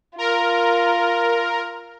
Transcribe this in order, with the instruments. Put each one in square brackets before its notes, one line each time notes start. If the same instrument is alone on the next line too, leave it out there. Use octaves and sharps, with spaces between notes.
[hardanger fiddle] F4 [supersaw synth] A#4